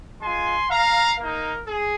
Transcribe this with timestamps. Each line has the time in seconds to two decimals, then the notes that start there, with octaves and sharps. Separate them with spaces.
0.21 G#3 F4 G#5 C6
0.70 F5 A#5
1.19 A#3 D#4 A#4
1.67 G#4